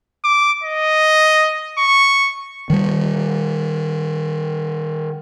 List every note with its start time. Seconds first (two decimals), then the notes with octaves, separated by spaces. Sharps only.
0.24 D6
0.64 D#5
1.78 C#6
2.70 D#3 G3